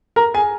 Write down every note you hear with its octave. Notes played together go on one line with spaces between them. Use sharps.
A#4 A#5
G#4 G#5